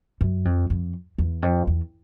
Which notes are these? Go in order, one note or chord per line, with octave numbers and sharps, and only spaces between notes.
F#2
F2
F2
E2
F2
E2